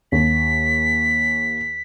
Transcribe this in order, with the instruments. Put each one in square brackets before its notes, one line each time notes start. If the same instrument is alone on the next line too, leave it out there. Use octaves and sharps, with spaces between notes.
[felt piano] D#2 [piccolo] B6